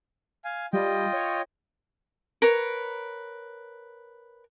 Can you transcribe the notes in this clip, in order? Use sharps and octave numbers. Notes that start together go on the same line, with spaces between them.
F5 G#5
G3 F4 D#5 G5
C#5
A#4 B4 C#5